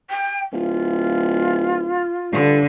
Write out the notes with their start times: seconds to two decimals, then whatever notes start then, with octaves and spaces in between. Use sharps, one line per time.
0.10 G5
0.52 D1 F4
2.32 G2 D3